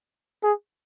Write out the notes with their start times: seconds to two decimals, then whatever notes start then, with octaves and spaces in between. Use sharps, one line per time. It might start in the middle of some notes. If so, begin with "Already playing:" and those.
0.43 G#4